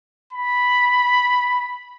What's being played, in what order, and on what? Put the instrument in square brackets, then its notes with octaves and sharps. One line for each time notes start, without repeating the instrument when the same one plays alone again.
[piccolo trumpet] B5